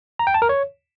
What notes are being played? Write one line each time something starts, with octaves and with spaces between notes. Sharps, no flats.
A#5
G5
A5
A#4
C#5